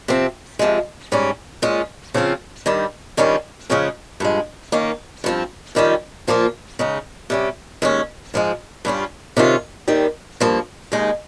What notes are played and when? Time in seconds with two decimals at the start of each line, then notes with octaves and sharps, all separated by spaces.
0.08 C3 F3 C4
0.59 F2 C3 F3 G#3
1.12 G#2 G3 C#4
1.62 A#2 G#3 C#4 F4
2.14 C#3 F3 C4 F4
2.66 G2 D#3 G3
3.17 G2 D#3 G3 C#4 F4
3.70 C#3 F3 G#3 C#4
4.20 G2 F3 G#3
4.72 D#3 A#3 C#4
5.24 G2 F3 C4
5.75 F2 D#3 G3 C#4 F4
6.27 A#2 F3 A#3 F4
6.79 C#3 G#3 D#4
7.30 C3 G3 C#4
7.82 D#2 D#3 G#3 C#4
8.34 G#2 F3 G#3
8.85 G2 G3 C#4 F4
9.37 C3 D#3 G#3 C#4 F4
9.88 D#2 D#3 G3
10.40 G2 F3 A#3
10.92 D#2 C#3 G#3 D#4